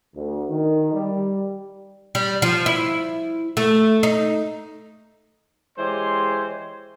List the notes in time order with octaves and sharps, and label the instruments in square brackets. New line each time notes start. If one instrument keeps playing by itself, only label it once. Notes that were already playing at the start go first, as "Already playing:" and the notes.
[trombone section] D2
D#3
G3
[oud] G3
F3
E4
A3
D#4
[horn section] E3 G#3 G4 C5 C#5 C6